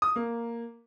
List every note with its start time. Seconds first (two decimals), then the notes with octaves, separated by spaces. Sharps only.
0.02 D#6
0.16 A#3